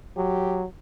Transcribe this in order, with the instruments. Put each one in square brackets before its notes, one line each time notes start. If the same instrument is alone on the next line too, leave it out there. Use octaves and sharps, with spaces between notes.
[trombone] F#3 [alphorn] G4